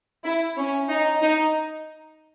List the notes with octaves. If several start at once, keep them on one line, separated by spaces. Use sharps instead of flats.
E4
C#4
D#4
D#4